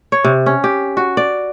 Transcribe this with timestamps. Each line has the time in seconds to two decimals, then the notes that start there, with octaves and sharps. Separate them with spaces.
0.12 C#5
0.24 C3
0.46 C#4
0.64 G4
0.97 F#4
1.17 D5